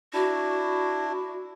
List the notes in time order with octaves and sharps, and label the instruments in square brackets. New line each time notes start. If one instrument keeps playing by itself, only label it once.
[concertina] D4 E4 [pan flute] F#4